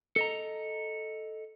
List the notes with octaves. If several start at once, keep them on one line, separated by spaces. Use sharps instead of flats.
A4 D#5 A#5